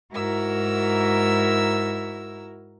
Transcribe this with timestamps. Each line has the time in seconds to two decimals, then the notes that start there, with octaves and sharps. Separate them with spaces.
0.12 G#2 E4 F#4 A#4 A#5 E6